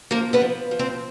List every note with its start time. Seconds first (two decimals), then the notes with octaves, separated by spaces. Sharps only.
0.11 F3 A#3 A#4
0.33 B3 B4
0.41 F3
0.71 F3
0.79 C4 C5